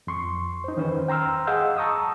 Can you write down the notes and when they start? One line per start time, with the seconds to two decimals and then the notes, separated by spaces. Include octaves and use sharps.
0.07 F2 C6 C#6
0.64 D#4 C5
0.76 E2 D#3 C#4 B4 C5
1.08 G5 A#5 C6 E6 F6
1.47 G#4 D#5 F5 F#5 E6 G6
1.77 A5 A#5 C#6 D#6 E6